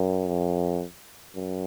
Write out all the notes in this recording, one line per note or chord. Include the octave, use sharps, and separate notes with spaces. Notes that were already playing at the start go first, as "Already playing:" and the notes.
Already playing: F#2
F2
F#2